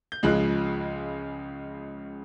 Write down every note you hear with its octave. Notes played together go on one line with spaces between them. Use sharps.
G6
C#2 C#3 F3 G#3 F#6